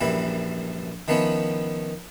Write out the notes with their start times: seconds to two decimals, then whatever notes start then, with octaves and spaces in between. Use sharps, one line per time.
0.01 A#1 F#2 E3 G3 E4
1.08 D#3 F3 B3 C#4 E4